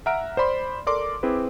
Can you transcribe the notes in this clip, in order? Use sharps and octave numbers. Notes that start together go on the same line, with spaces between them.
E5 F#5 A#5 F6 D7
C5 D5 B5 C6
A4 A#4 D5 C6 D6
C4 E4 G#4 B4